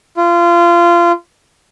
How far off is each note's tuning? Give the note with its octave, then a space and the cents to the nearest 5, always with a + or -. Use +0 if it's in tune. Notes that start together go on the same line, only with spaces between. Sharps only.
F4 -25